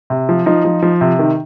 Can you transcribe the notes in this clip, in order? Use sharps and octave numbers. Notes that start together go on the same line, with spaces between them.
C3
F3
F3 D#4
F3
F3
C3
D#3